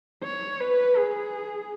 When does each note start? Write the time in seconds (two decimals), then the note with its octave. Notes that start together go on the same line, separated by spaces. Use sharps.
0.24 C#5
0.60 B4
0.97 G#4